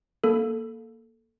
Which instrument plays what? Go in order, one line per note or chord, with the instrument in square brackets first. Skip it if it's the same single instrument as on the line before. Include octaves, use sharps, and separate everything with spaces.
[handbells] A#3 A4